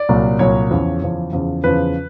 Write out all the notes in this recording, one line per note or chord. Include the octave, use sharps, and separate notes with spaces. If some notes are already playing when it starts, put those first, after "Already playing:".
Already playing: D5
C2 A#2 F#3
C2 A#2 F#3 C#5
E2 C#3 F3
E2 C#3 F3
E2 C#3 F3
E2 C#3 F3 B4